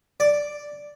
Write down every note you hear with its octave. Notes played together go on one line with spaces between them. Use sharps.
D5